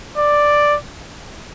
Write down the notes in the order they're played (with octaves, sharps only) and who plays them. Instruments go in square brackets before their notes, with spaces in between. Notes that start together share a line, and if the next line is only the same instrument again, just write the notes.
[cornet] D5